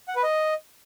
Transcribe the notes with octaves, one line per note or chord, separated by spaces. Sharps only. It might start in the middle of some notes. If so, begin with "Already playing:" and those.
F#5
B4
D#5